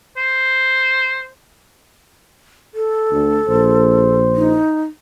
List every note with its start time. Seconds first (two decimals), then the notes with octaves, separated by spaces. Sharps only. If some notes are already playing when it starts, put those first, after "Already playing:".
0.17 C5
2.74 A4
3.11 D2
3.48 A#1 C5
4.36 D#4